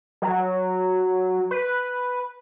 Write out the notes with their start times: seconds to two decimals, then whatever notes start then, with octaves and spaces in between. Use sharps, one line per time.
0.22 F#3
1.51 B4